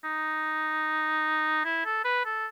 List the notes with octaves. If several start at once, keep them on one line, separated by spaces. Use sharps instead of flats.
D#4
E4
A4
B4
A4